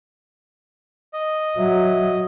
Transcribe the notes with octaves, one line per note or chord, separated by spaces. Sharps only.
D#5
F#3 E5